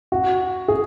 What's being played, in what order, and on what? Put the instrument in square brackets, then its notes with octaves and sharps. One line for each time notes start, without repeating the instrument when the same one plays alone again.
[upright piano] F#4
G#4